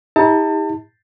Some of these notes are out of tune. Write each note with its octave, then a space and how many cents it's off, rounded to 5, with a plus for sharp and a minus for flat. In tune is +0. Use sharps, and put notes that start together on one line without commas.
D#4 +45 G4 +40 A5 +35